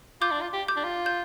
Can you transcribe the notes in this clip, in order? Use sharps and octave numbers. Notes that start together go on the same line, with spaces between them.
F4 D6 G6
D4
F4
G4
D6 G6
D4
F4
G6